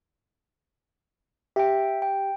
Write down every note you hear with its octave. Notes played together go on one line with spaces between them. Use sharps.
G4 E5 G5
G5